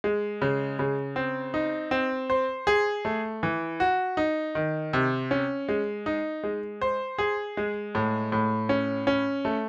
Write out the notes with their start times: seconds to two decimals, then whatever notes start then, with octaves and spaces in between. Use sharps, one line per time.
0.04 G#3
0.42 C#3
0.79 C#3
1.16 C4
1.54 D#4
1.91 C4
2.30 C5
2.67 G#4
3.05 A3
3.43 E3
3.80 F#4
4.17 D#4
4.55 D#3
4.93 C3
5.31 C#4
5.69 G#3
6.06 D#4
6.44 G#3
6.81 C5
7.18 G#4
7.57 G#3
7.95 A2
8.32 A2
8.69 C#4
9.07 C#4
9.45 A3